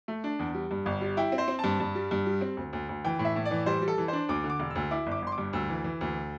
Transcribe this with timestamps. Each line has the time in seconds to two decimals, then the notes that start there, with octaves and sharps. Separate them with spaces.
0.08 A3
0.24 D4
0.39 E2
0.54 G3
0.71 G2
0.86 G1
1.01 G3
1.17 E4 G5
1.32 C4
1.38 C5
1.48 C4
1.59 G2 A5
1.80 G2
1.95 G3
2.11 G2
2.26 G3
2.41 C4
2.57 D2
2.73 D2
2.89 D2
3.05 E3 G5
3.19 A2
3.25 E5
3.36 A2
3.45 D5
3.51 E3
3.66 G3 C5
3.82 G3
3.88 A4
3.98 E3
4.08 D4 C5
4.29 D2 D6
4.44 D3
4.50 D6
4.60 E1
4.70 E6
4.75 D2
4.91 E4 D6
5.06 G1
5.11 D6
5.22 G1 C6
5.32 D6
5.38 G2
5.53 D2 E6
5.69 E3
5.84 E3
6.01 D2